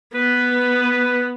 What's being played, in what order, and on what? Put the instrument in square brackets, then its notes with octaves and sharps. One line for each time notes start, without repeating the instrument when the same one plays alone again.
[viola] B3 [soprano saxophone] B4